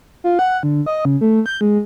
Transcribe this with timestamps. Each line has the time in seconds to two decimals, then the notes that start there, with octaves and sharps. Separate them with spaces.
0.24 F4
0.39 F#5
0.63 D3
0.86 D#5
1.05 C#3
1.21 A3
1.46 G6
1.61 G#3